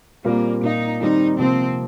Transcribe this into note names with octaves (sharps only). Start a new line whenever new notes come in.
A#2 G3 A#3 C4 F4 A#4
A#2 A#3 D#4 F4
D#3 G3 C4 D#4
C3 F3 A#3 C4